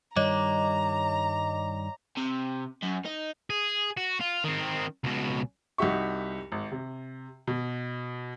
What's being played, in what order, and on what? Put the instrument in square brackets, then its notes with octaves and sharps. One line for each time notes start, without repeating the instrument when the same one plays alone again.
[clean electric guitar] G2 D#3 G3 [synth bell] C#5 D#5 D6 [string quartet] A#5
[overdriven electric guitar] C3
F#2
D#4
[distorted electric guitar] G#4
F#4
F4
D#3 C4
C#2 B2
[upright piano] C2 D#4 F#4 G4 E5 C#6
G#1
C3
B2